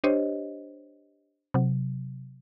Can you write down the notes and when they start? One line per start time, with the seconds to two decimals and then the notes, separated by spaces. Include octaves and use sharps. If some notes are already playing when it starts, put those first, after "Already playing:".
0.04 D4 G4 C5 C#5 D#5
1.54 C3 F#3